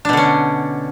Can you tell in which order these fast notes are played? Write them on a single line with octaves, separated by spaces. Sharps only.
D4 B2 D3 C#4